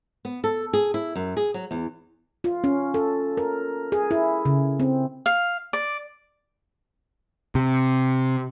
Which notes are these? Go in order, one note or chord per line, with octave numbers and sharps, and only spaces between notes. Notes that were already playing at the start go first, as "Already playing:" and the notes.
B3
A4
G#4
E4
F#2
G#4
F#3
E2
F4
C#4
A4
A#4
G#4
E4
C#3
C4
F5
D5
C3